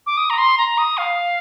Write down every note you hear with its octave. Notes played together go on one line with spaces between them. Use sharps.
D6
D#6
A#5
C6
A#5
D#6
F5